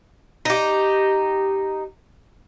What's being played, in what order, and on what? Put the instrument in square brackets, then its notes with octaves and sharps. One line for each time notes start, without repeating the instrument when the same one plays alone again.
[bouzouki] D#4 G4